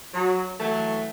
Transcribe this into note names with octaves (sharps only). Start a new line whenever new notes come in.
F#3
E3 F#3 A3